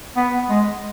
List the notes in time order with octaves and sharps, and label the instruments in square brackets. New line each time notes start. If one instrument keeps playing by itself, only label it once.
[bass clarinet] B3
G#3